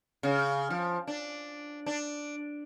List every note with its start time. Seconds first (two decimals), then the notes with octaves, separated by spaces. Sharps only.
0.23 C#3
0.70 F3
1.07 D4
1.86 D4